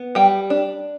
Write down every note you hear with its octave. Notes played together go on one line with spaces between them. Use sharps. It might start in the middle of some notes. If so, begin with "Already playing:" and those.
Already playing: B3
G3 G5
D4